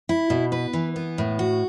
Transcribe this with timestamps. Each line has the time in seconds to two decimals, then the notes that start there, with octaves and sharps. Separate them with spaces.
0.09 E4
0.30 B2
0.52 B4
0.73 E3
0.96 B3
1.18 A2
1.39 F#4